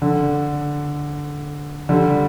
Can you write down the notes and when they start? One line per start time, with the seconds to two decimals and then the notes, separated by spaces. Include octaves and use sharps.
0.02 D3
1.89 D3 G3